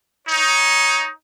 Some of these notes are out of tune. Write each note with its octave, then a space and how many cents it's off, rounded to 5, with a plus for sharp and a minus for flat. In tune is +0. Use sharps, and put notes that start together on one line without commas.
D#4 +15 C#5 +0